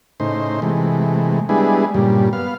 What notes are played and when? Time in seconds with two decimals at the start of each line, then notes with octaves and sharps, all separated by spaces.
0.20 A2 C#3 D#4 C5
0.62 C3 E3 G#3 A3
1.49 G3 G#3 B3 D4 E4 G#4
1.94 G2 A#2 C#3 G3
2.33 B3 F5